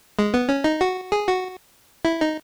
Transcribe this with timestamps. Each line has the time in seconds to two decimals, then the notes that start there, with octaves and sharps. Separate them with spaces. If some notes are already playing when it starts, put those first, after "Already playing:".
0.19 G#3
0.34 B3
0.49 C#4
0.64 D#4
0.81 F#4
1.12 G#4
1.27 F#4
2.05 E4
2.21 D#4